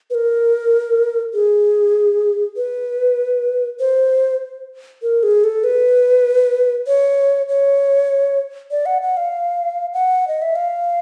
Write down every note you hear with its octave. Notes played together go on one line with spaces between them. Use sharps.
B4
A#4
G#4
B4
C5
A#4
G#4
A4
B4
C#5
C#5
D5
F#5
F#5
F5
F#5
D#5
E5
F5